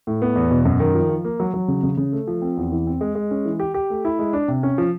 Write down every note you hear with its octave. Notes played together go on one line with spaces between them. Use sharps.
A2
B3
E2
B2
F#2
D#3
F3
F3
A#3
F#3
F#3
C#3
C#3
C#3
A3
F3
C4
E2
E3
C4
G#3
G#3
C#4
E3
G4
G4
A3
E4
G#3
D4
C3
C#4
F3